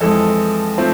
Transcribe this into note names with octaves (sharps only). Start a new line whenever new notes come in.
F2 E3 G#3 A4
F3 A3 C4